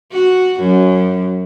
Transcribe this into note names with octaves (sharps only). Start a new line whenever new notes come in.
F#4
F#2